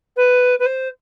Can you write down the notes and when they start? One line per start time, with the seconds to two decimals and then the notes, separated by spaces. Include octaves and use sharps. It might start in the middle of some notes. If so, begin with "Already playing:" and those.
0.16 B4
0.59 B4
0.66 C5